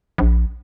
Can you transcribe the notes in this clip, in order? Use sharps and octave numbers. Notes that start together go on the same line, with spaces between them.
A#1